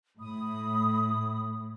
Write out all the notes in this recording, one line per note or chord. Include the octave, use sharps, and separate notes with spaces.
A2 B5 D#6